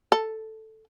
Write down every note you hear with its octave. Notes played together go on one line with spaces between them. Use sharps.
A4